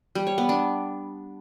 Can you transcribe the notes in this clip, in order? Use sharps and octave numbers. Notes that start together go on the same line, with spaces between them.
G3
C#5
B3
D4